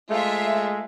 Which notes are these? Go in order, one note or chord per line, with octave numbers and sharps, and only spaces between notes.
G#3 A3 F4 C5 E5